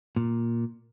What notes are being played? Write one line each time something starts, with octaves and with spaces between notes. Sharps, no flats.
A#2